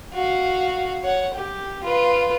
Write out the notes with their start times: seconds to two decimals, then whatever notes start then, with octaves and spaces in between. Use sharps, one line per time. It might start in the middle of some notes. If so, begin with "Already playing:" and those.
0.14 F#4 F5
1.04 C#5 F#5
1.34 G4
1.83 F4 B4